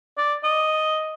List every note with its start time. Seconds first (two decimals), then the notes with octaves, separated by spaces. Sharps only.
0.18 D5
0.44 D#5